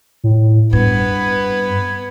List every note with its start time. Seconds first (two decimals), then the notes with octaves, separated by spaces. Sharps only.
0.24 A2
0.73 G2 B3 B4 G#6